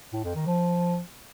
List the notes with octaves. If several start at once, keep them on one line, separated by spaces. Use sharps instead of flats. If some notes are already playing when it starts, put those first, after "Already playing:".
A2
F2
D#3
F3